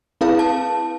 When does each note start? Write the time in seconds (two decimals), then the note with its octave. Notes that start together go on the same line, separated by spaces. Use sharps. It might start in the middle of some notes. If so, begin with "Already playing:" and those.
0.21 C4 E4 G#4 B4 F5
0.39 A5